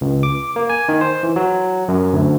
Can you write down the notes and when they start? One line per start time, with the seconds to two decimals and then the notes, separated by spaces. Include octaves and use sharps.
0.01 C#2
0.23 D6
0.56 A#3
0.70 G#5
0.89 D#3
1.01 C5
1.23 E3
1.36 F#3
1.88 F#2
2.13 D2